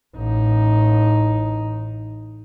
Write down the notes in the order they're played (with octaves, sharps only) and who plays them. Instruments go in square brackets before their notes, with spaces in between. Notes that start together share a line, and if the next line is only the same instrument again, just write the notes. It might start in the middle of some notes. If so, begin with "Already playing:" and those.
[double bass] A1 D#4